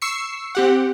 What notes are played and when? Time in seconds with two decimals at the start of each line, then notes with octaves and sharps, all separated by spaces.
0.02 C#6 E6 C7 C#7
0.55 C4 G4 F#5